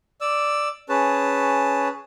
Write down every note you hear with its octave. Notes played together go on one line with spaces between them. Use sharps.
D5 E6
C#4 G#4 B4 A5